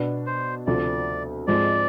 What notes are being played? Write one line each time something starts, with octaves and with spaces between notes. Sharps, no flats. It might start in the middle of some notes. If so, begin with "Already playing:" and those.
Already playing: B2 B3 D4
C5
D2 C3 F3 D5
G#2 F3 G#3 C4 D5